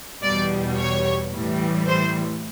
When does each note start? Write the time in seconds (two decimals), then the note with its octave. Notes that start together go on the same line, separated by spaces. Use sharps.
0.22 E2 B2 G3 D5
0.77 C#5
1.32 A2 E3 G3
1.87 C5